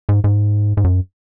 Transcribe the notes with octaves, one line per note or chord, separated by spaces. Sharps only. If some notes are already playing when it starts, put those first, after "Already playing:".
G#2
G#2
G#2
F#2